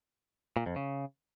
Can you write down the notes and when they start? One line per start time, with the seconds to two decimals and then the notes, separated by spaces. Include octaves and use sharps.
0.57 A#2
0.66 F2
0.76 C#3